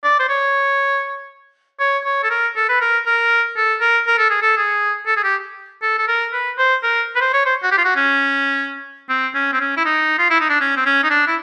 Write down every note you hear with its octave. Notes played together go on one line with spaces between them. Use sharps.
D5
C5
C#5
C#5
C#5
A4
A#4
A4
B4
A#4
A#4
A4
A#4
A#4
A4
G#4
A4
G#4
A4
G#4
G4
A4
A4
A#4
B4
C5
A#4
B4
C5
C#5
C5
F#4
G4
F4
F#4
C#4
C4
C#4
C4
C#4
E4
D#4
F4
E4
D#4
D4
C#4
C4
C#4
D#4
D4
E4